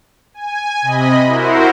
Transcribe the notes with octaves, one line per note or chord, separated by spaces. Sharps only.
G#5
C3 D#5 B5
E4 F#4 A#4 C5